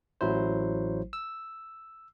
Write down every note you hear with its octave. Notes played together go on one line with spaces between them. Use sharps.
A1 F#3 E4 C5
E6